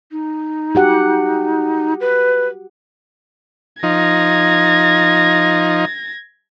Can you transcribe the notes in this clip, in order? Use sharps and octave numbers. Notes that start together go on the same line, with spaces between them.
D#4
F#4 G4 F#5
B4
F3 D#4 G#6 A#6